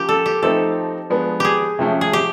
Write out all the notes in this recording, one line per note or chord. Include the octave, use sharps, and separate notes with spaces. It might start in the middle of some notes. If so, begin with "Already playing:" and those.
Already playing: C#3 F3 A#3 G4
A4
G4
F3 A3 C4 D#4 A4
F3 G#3 B3 D4
G4 G#4
C3 F3 A3 C#4
G#4
G4